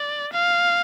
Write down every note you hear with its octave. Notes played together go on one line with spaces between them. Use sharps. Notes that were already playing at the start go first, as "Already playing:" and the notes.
Already playing: D5
F5